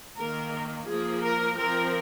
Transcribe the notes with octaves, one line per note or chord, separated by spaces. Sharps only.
D#3 A#3 A#4
F3 A#3 G#4
A#4
F3 C4 A#4